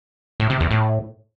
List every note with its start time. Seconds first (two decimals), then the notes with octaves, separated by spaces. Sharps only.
0.40 A2
0.50 C3
0.60 E2
0.71 A2